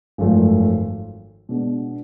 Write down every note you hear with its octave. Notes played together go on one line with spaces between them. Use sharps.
G#1 F#2 F3 A3 F4
B2 G#3 D4